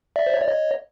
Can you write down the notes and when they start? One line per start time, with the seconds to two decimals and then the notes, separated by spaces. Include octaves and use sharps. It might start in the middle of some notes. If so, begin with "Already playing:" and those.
0.16 D5 E5
0.27 C5
0.34 C#5
0.41 D5
0.48 C#5 D#5